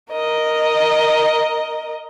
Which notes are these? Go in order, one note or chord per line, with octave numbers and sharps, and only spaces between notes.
A#4 D#5